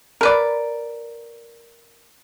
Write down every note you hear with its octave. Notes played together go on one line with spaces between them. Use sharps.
A#4 B4 D5